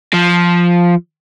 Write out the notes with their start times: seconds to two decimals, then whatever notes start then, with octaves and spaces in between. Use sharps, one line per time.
0.14 F3